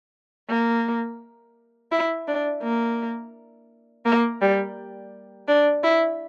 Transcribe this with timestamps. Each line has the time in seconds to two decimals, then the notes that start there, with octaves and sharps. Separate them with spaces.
0.49 A#3
1.92 E4
2.28 D4
2.63 A#3
4.05 A#3
4.41 G3
5.48 D4
5.83 E4